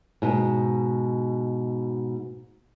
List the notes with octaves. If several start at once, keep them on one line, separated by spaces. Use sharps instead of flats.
G#2 B2